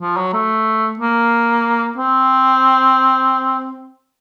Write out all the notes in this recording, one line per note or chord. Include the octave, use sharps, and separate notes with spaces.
F3
F#3
A3
A#3
C4